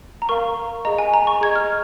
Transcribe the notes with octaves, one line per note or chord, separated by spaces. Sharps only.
A#5
A#4 F5 C#6
G#4 D#5 A#5
G#5
A#5
C#6
G#4 D#5 G#6
F6